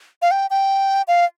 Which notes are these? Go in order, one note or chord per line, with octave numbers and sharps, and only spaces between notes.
F5
G5
G5
F5